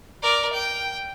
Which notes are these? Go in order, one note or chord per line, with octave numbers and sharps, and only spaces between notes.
A#4 D5
G5